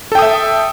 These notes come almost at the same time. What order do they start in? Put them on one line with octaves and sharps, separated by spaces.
A4 G5 D#6 E5